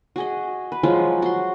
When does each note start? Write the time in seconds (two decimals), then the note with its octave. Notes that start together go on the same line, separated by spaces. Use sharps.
0.16 F#4 G#4 D#5
0.72 B4
0.83 F3 F#3 G#3 F4
1.22 F#4 C6